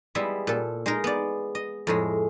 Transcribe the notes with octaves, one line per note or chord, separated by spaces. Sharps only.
G3 G#3 B3 E4 E5
A#2 A4
G#3 D#4 A#4
B3 D5
D#5
F2 A2 G#3